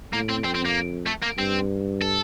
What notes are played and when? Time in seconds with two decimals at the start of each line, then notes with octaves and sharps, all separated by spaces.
0.13 A2 A#3
0.29 C4
0.45 F2 C4
0.55 C4
0.66 A#3
1.07 A3
1.23 A#3
1.39 G2 C4
2.02 A4